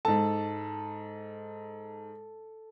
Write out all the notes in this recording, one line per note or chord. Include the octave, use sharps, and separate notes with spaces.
G#2 A4 A5